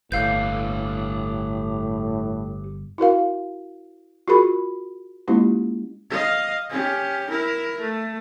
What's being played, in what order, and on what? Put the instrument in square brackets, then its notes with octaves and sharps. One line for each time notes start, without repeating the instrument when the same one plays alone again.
[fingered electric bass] G1 [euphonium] A2 [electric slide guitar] G4 A4 B4 [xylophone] F5 G6
[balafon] E4 F#4 A#4 F5
F4 F#4 G#4 A#4 B5
G#3 A#3 C#4 E4 F4 G4
[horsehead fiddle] D#5 F5
C#4 G4
E4 A#4
A3